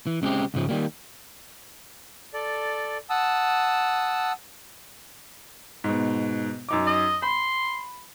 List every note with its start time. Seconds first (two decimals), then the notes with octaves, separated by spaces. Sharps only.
0.07 E3
0.22 C#2 C#3 G#3 C4 G4
0.54 C#2 G#2 C#3 F3
0.69 D#3 F#3 G3 A#3
2.34 A4 D5
3.10 F#5 A5 D#6 E6
5.84 G#2 B2
6.69 F#2 D#4 D6
6.86 D#5
7.22 B5 C6